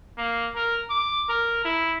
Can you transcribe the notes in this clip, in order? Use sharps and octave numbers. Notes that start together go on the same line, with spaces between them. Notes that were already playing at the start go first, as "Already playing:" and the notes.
A#3
A#4
D6
A#4
E4